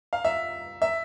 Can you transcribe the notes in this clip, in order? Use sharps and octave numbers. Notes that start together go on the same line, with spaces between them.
F5
E5
E5